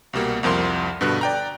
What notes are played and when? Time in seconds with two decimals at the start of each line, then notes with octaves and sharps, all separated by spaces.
0.13 C2 B2 G3 A#3
0.43 C2 F2 F3 A#4 C6
1.01 G2 B2 D3 B4 F#6
1.21 D5 G5 A#5